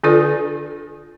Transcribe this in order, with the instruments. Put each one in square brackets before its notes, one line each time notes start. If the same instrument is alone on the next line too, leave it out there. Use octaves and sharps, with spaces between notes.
[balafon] D3 D4 F4 A4 B4 D5